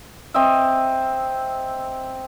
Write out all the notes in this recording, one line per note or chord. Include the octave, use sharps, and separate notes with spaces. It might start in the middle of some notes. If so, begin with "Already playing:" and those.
C4 D#5 E5